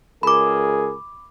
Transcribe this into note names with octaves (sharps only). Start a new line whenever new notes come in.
C#2 G#4 A#4 B5 D6